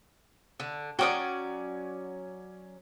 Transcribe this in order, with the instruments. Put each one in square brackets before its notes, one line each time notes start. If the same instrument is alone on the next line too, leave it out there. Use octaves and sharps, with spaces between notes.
[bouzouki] D3
[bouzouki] F#3 C#4 D5 [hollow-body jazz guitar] F#4 [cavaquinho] G5 D6 D#6